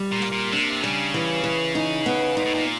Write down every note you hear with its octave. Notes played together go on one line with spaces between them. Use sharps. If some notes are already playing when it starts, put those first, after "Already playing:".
Already playing: G3
A#2
A#3
A#2
C3 D4
C#3 G3
E3
E3
D#4
B3
A#2 D#4
A2
A#2